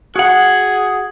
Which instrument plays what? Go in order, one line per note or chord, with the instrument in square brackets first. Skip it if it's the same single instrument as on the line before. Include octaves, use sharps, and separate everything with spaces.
[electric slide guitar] F#4 F#5 [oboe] G#4